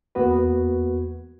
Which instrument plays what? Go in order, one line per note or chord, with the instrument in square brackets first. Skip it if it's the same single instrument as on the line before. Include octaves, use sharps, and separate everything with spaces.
[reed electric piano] E2 A#3 B3 F#4 B4